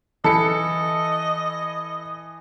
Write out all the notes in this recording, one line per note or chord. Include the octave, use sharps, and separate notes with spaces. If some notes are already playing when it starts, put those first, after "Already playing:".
E3 A4 D#5 C#7